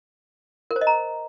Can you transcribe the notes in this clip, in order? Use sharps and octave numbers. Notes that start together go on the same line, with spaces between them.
A#4
C5
D#5
A#5